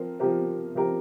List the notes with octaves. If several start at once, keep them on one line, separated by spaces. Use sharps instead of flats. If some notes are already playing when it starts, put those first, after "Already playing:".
Already playing: F3 C4 A#4
F3 C4 G4 A#4
F3 C4 G4 A#4